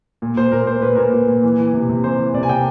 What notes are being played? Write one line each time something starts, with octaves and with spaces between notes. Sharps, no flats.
A#2
A#2 C5
A#2 A#4
A#2 C5
A#2 B4
A#2 A#4
A#2 B4
A#2
E3
E3
C3
C3
E3 C5
E3
C3 D5
G#5
C3 G5